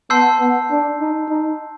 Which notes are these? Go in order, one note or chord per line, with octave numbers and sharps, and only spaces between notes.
B3 A5 C6 E6 G6 C7
B3
D4
D#4
D#4